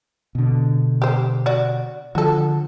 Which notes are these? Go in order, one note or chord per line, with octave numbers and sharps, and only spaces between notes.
B2 D3
G4 C5
F#4 D5
D3 F3 F#4 A4